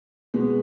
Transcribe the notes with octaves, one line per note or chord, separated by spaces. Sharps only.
B2 G#3 B3